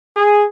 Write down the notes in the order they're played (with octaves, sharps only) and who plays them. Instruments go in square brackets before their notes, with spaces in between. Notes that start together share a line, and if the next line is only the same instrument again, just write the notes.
[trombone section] G#4